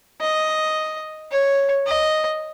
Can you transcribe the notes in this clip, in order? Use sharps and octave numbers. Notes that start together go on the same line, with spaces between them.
D#5
C#5
D#5